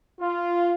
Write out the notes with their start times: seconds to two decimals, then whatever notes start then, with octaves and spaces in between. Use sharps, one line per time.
0.20 F4